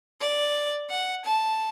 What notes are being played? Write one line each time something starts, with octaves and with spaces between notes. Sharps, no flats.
D5
F#5
A5